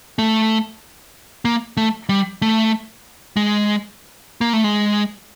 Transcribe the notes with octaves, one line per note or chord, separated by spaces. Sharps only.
A3
A#3
A3
G3
A3
G#3
A#3
A3
G#3